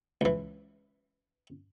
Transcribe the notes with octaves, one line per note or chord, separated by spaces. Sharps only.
C#2 E3